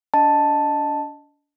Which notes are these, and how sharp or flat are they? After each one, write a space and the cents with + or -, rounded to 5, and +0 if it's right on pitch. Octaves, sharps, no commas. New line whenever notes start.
D4 -35 D#5 -10 A5 +0